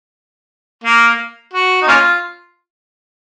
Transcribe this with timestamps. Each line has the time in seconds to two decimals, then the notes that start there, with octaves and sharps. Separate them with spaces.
0.84 A#3
1.53 F#4
1.82 D#4
1.87 A#3 C#4 F4